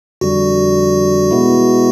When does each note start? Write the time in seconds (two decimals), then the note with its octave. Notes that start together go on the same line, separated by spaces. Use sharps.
0.21 F2 D3 G3 F#4
1.31 B2 G#3 B3 E4